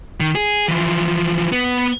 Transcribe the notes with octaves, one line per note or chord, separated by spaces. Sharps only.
D#3
G#4
E3 F3
B3